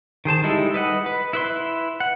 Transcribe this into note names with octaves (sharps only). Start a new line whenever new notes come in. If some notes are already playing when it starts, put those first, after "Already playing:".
D#3 G#4 C5 A5
G3 G#3 D#4 E4 A4
B4 D#5 F#5
B4
E4 B4 C6
F#5